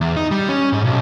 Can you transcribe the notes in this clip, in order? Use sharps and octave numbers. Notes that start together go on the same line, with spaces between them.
E2
D#4
G3
C#4
G#2
B1